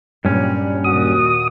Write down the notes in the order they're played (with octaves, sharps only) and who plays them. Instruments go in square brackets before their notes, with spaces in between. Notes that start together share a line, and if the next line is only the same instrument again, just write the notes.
[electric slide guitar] G2 C#4 [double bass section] A#2 F#3 G3
[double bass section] D#2 A#2 [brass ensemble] F#4 [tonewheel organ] D#6